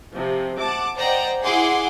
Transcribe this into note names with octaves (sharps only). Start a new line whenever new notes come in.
C3 F3
F#5 A5 D6
C5 D5 D#5 F#5 G5 A#5
E4 G#4 F#5 C6 D6